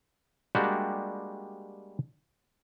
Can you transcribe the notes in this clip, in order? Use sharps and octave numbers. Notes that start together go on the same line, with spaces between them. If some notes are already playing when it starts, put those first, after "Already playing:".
G3 G#3 A#3 D4 F#4 G4